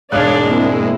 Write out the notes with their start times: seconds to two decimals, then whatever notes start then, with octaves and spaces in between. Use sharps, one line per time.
0.12 E1 G#2 D4 C#5 D5 F5 D#6 F#6
0.43 A#3 C4 E4